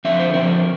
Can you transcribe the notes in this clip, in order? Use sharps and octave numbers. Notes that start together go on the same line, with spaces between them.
D3 F3 C4 E5
C5
D3 F3 C4 A#4